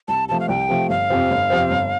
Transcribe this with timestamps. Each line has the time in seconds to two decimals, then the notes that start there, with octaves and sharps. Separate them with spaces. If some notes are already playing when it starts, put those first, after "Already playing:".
0.08 C2 A5
0.29 C3 F3 A3 A5
0.40 F5
0.49 C2 G5
0.69 C3 F3 A3
0.89 G1 F5
1.10 F2 C3 F3 C4
1.30 G1
1.50 F2 C3 F3 C4
1.70 G1